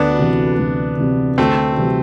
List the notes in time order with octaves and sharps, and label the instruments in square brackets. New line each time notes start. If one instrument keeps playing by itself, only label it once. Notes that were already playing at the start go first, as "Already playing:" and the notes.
Already playing: [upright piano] D2 [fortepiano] B3 D4
[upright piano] C3 E3
D2
C3 E3
[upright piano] D2 [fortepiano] A3 C4
[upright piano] C3 E3 G3